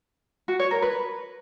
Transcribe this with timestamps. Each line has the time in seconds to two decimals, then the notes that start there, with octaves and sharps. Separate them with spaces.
0.48 F#4
0.60 C#5
0.71 A#4
0.82 B4